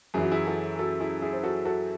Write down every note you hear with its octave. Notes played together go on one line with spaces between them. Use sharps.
F#2 E3 G#4
F#4
E4 G#4
F#4 A4
F#4 A4
E4 G#4
E4 G#4
C5
F#4 A4
F#4 A4